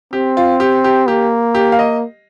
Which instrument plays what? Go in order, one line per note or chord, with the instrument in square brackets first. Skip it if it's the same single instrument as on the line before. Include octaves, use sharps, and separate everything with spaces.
[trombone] C4 [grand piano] G4
[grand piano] F4
G4
G4
[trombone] A#3 [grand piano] G4
[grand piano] G4
F5
D#5